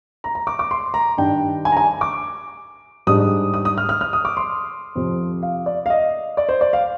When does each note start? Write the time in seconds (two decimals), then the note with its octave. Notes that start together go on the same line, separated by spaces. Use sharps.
0.24 A#5
0.35 A#5
0.47 D6
0.59 D6
0.71 C6
0.94 A#5
1.18 G2 D#3 G3 D4 G5
1.65 G#5
1.72 A#5
1.77 G#5
2.01 D6
3.07 G#2 G3 D4 D#6
3.54 D#6
3.65 D#6
3.78 F6
3.89 F6
4.01 F6
4.13 D#6
4.25 D6
4.37 C6
4.95 F2 C3 F3
5.43 F5
5.66 D5
5.86 F5
5.90 D#5
6.37 D5
6.49 C5
6.61 D5
6.73 F5